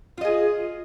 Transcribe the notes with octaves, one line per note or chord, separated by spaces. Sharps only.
F4 G#4 D#5